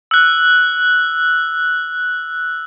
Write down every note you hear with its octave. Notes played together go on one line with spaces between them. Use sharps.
E6 F#6